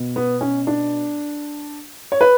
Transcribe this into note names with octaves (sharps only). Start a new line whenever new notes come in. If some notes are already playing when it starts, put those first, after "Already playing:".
Already playing: B2
B3
C#4
D4
C#5
B4